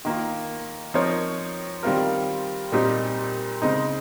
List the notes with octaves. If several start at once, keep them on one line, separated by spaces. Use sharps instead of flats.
D#3 A#3 F4
F3 C4 D#4 A#4 C#5
D#3 G3 C4 F4 A#4
A#2 G3 C4 D#4 G4
C#3 G#3 C4 D#4